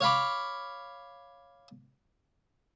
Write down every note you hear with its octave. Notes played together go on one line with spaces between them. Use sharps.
C#5 F5 B5 D6